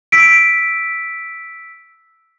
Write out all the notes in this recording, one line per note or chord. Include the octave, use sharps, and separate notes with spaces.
E6 B6 D7